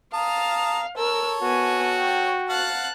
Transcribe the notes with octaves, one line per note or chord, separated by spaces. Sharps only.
F5 A5 A#5 D#6
A4 A#4 C#5 E6
B3 F#4 G#5
G5
F5 F#5 A5 F#6